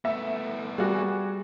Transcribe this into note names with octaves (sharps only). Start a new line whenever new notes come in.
A3 B3 E5
G3 F#4 G#4